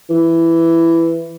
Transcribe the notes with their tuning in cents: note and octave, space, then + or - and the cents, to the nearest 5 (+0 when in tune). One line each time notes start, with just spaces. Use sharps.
E3 +10